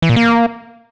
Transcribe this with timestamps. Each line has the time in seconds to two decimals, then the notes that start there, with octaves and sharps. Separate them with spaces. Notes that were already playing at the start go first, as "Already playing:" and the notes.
0.02 E3
0.09 A#2
0.16 A#3